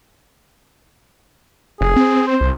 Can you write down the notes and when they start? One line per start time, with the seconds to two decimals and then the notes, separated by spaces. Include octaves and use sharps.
1.81 F1 G#4
1.96 C4
2.27 C5
2.41 C2